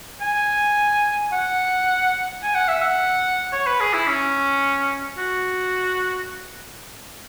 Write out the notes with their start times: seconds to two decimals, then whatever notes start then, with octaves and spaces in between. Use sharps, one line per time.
0.21 G#5
1.33 F#5
2.43 G#5
2.55 F#5
2.68 E5
2.82 F#5
3.53 C#5
3.67 B4
3.80 G#4
3.94 E4
4.08 C#4
5.18 F#4